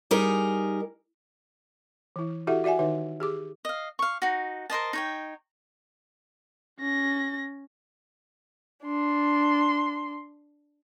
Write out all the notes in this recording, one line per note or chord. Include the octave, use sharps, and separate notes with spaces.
G3 D#4 G#4 A#4
E3 E4
E4 F#4 G4 A4 E5 F#5
F#4 D5 E5 F#5 G#5
D#3 D#4 B4 E5
G4 G#4 D6
D#5 F5
F5 C#6
D#4 F#4
A#4 C5 D#5 A5
D#4 C#5 G5
C#4 A#6
D4 C6